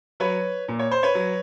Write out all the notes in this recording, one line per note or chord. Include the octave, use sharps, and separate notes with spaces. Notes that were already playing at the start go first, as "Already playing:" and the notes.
F#3 B4 C#5
A#2
C#5
C5
B4 C#5
F#3